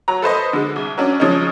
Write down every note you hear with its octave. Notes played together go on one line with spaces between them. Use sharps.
F#3 A#5
A4 B4 C5 D#5
D3 G#3
C2
F#3 C#4 D4
C#3 F3 G#3 C#4 D#4